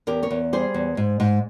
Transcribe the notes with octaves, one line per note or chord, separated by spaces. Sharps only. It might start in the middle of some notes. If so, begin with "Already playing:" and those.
E2 G4 A#4
A#4 C#5
E2
G3 G#4 C5
E2
G#2
G#2